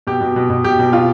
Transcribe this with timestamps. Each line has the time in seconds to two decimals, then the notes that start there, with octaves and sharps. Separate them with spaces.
0.07 B2 G4
0.21 B2
0.36 B2
0.50 B2
0.64 B2 G4
0.79 B2
0.92 B2 F4